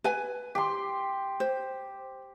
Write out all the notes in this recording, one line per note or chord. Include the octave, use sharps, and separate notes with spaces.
B4 G#5
G4 C6
C5